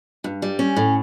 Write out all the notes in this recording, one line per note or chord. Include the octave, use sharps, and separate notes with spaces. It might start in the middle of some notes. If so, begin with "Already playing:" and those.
G2
G3
C#4
A2